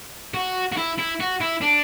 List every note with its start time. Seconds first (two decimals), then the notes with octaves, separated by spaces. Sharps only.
0.34 F#4
0.72 F#4
0.77 E4
0.98 E4
1.20 F#4
1.41 E4
1.61 D4